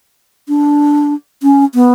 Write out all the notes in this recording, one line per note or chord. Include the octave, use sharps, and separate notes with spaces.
D4
C#4
B3